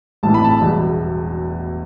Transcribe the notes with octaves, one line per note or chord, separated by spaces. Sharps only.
A1 A2 E3 A5
B5
A5
E1 E2 B2 G3